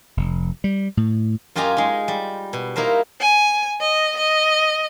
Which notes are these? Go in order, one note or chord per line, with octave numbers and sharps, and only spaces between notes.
F1
G3
A2
F#2 F4 G4 D#5 G#5 A#5
G#3 D#4
G3
B2
A#3 D#4 E4 A#4 C5
G#5
D#5
D#5